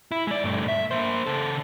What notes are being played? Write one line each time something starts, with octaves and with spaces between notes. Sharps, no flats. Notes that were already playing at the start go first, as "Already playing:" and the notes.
E4
G#3 D5
G2 A3
E5
A#3 C5
C#3 A4